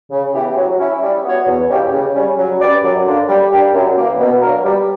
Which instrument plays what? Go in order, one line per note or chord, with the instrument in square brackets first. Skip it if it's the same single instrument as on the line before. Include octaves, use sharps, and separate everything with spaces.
[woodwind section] C#3
E3 B3 E4 G4
F#3
C#4 E4
G3
B3 F#4 C#5
E2
B2 A#3 C#4 G4
C#3
G3 C#4
F#3
C#4 G4 B4 D5
F#2
D3 A#3 D4
G3
A#3 D4 G4
F#2
E3 A#3
B2
F#3 A#3 D4 A#4
G3